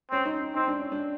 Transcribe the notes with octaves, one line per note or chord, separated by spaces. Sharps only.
C4 C#4
D#4
D#4
C4 D#4
D4
C#4
D4